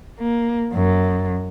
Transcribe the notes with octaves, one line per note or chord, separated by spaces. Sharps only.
A#3
F#2